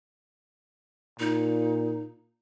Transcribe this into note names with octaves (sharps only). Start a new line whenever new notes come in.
A#2 D#4